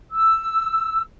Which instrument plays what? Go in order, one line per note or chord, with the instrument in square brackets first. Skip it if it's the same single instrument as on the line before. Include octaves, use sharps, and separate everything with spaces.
[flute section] E6